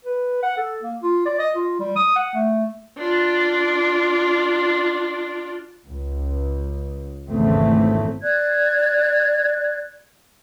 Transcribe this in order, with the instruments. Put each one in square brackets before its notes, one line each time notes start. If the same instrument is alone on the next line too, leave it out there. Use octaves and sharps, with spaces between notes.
[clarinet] B4
F#5
A4
A#3
F4
D5
D#5
F4
G3
D#6
F#5
A3
[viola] D4 F4
[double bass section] C#2
G#1 E2 C#3 A3 C4
[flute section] D5 F#6 G#6